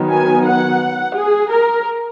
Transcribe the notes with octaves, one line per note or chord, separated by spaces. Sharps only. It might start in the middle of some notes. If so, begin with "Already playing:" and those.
Already playing: D#3 F#3 B3
G#5
F#5
G#4
A#4